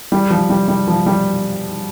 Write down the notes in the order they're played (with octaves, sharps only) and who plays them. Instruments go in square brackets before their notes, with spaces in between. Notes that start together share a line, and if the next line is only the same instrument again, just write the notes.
[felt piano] G3
F3
G3
G3
F3
G3